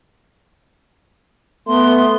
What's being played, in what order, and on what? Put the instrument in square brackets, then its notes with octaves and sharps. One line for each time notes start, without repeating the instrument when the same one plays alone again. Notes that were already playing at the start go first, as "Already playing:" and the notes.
[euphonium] A3 [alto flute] B3 [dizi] C6